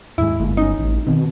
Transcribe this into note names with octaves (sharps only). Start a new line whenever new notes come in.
D#2 G#2 G#3 E4
G1 G#3 A#3
C4 C#4 D#4
A1
B2 D#3 C4